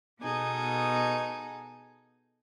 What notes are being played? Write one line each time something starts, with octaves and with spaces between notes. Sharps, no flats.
B2 B3 D#4 G#4 A4